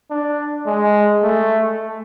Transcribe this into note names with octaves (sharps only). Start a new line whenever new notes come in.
D4
G#3
A3